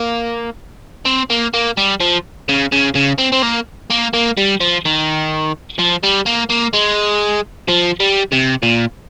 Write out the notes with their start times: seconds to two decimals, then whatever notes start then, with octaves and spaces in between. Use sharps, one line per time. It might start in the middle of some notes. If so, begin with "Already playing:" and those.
Already playing: A#3
1.06 C4
1.30 A#3
1.54 A#3
1.77 G3
2.00 F3
2.49 C#3
2.72 C#3
2.95 C#3
3.19 C4
3.32 C4
3.43 A#3
3.90 A#3
4.13 A#3
4.37 G3
4.60 F3
4.85 D#3
5.79 F3
6.03 G3
6.26 A#3
6.50 A#3
6.74 G#3
7.68 F3
8.00 G3
8.32 C3
8.63 A#2